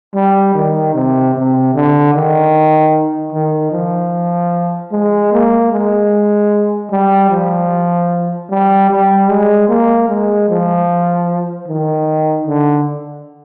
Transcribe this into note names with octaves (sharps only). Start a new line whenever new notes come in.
G3
D#3
C3
C3
D3
D#3
D#3
F3
G#3
A#3
G#3
G3
F3
G3
G3
G#3
A#3
G#3
F3
D#3
D3